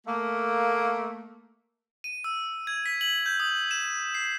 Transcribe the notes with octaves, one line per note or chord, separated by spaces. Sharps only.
A3 A#3
D#7
E6
G#6
B6
F#7
G6
D#6
E7
C7